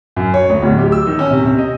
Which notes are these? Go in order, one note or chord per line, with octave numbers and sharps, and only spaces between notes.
F#2
C#5
D2
D1
G4
E6
D#3
C#4
C3
C3
D#5